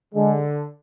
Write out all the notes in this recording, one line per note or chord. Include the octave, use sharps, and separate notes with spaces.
D3 G#3